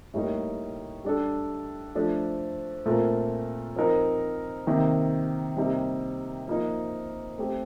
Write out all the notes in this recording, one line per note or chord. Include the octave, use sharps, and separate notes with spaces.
A2 G3 A#3 D#4 A#4
G3 D4 A4
F3 A3 D4 A4 C5
A#2 A3 C4 F4 A#4
F3 C4 D#4 A#4
C3 D#3 A#3
C3 G3 A#3 D#4
F3 A#3 D#4
A3 C4 G4